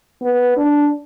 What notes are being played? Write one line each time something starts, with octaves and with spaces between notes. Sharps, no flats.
B3
D4